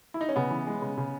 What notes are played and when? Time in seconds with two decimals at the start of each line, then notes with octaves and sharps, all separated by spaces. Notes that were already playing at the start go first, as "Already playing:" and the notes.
0.14 E4
0.21 D#4
0.29 C#4
0.36 C#3 B3
0.51 E3
0.67 G#3
0.82 C#3
0.97 C#3